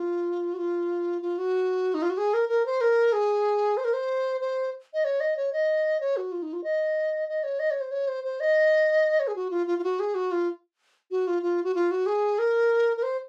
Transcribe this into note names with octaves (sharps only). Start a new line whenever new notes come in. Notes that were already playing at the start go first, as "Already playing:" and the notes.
Already playing: F4
F#4
F4
F4
F#4
D#4
F4
F#4
G#4
A#4
A#4
C5
A#4
G#4
C5
A#4
C5
C5
D#5
C#5
D#5
C#5
D#5
C#5
F#4
F4
D#4
F4
D#5
D#5
C#5
D#5
C#5
C5
C#5
C5
C5
D#5
C#5
G#4
F#4
F4
F4
F4
F#4
G#4
F#4
F4
F#4
F4
F4
F#4
F4
F#4
G#4
A#4
A#4
C5